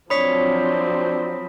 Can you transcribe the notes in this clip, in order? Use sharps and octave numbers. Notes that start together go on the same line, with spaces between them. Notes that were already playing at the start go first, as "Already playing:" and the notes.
F3 F#3 C4 D4 C#5 B5 D#6 B6